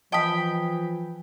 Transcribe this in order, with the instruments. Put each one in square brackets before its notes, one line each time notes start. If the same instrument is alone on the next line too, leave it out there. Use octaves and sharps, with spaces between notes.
[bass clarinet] E3 [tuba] F3 [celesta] D#5 A5 D#6 [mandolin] G5 B5